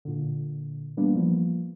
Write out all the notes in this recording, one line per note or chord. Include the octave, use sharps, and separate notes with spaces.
A#2 D3
E3 G3 A#3 B3 D4
F3 A#3 B3